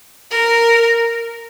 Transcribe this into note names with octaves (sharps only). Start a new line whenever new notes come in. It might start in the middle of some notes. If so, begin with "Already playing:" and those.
A#4